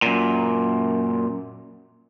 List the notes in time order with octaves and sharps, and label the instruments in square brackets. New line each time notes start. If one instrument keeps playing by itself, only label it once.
[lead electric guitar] F#2 A#2